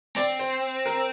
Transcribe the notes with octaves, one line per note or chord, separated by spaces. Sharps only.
C4 D5
C5
A#4